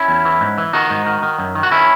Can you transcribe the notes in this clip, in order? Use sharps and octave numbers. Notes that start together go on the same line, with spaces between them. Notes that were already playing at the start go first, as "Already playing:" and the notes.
Already playing: C#4 E4
E2
E3
G#2
E3
D#3 D#4 F#4
G#2
D#3
D#3
F#2
D#3
F#4
D#3 C#4 E4